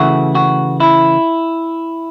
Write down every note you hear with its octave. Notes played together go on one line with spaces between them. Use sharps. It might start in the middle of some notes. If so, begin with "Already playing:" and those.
Already playing: C#3 E3 A3 F#4
F#4
E4